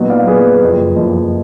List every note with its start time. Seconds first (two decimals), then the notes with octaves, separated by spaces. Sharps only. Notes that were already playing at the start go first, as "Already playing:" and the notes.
Already playing: A#2 F#3 B3 D#4
0.10 D5 F5
0.27 A#2 F#3 B3 D#4 G#4 B4
0.61 F#1 F2 F3
0.96 F#1 F2 F3